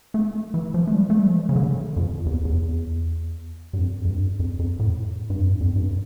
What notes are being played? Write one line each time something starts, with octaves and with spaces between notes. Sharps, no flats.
A3
E3
F3
A3
G3
A3
G3
F3
E3
C#3
D3
F2
E2
E2
G2
F2
F2
G2
F2
F2
A2
G2
F2
G2
F2
G2